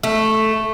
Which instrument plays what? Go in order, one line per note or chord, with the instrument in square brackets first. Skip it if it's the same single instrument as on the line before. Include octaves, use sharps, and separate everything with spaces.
[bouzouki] A3